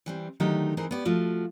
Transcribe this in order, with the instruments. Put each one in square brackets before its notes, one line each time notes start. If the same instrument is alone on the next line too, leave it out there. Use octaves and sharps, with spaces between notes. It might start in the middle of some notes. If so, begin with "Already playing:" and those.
[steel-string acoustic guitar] E3 G3 C4
D3 D#3 F#3 A3 D#4 G4
E3 C4 D#4 G#4 A#4
B3 G4 D5
F3 A3 F4 F#4